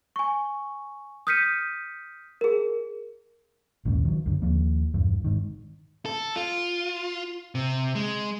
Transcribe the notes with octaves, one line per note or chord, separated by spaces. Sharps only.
G#5 C#6
D#6 F6 G6 B6 C#7 D#7
G#4 A#4
A#1 D#2 G#2 C#3
D#3 F#3
C#2 F#2 D3
D#2 F3 A#3
E1 E2 G2
G#2 D#3
A4
F4
C3
G#3